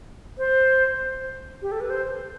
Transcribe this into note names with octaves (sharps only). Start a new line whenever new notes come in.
C5
G4
A4
B4
C5